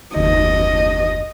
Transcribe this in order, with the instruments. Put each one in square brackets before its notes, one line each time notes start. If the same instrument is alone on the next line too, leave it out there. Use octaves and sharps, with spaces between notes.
[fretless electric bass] F#1 D#2 [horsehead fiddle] D#5